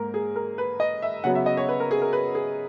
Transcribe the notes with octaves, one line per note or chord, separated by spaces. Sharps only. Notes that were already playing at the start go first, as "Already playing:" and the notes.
Already playing: G#2 A#3 A#4
G#4
A#4
B4
D#5
E5
C#3 F#3 B3 F#5
E5
D#5
C#5
B4
A#4
G#4
A#4
B4
G#4